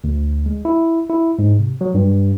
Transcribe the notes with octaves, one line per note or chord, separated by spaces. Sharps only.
D2
G#3
E4
E4
G#2
C3
F#3
G2